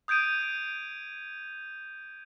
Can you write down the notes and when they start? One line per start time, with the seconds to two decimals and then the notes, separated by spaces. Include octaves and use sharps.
0.08 D#6 G6 G#6 D7 D#7